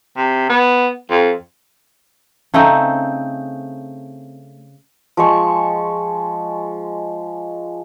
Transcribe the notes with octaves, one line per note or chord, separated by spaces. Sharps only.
C3
B3
F2
C#3 A3 C4 D#4
F3 G#3 C#6